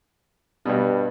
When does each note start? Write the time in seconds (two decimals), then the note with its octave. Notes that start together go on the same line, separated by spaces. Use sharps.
0.66 G2 B2 G3